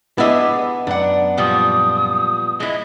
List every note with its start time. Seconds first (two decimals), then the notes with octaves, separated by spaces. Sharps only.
0.18 B3 D4 E4 G4 G#4 D#5 E5
0.87 F#2 D4 F#5
1.37 A#2 F3 G3 D#6
2.60 G#3 E4 D#5